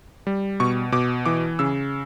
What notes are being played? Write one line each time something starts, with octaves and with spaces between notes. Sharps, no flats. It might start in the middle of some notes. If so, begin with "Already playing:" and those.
G3
B2 C#6
B2 D6
E3 D6
C#3 E6